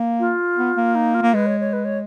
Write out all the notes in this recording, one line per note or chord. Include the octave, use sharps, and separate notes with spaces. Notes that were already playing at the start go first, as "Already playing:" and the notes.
Already playing: A#3
F4
B3
A#3
D#4
F4
A#3
G#3 B4
C#5
C#5
B4
C#5